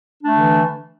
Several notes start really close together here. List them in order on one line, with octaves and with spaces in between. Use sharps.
D4 A3 D3 E3